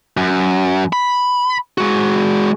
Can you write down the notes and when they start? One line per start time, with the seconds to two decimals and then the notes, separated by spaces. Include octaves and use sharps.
0.17 F#2
0.93 B5
1.78 G#3 F#4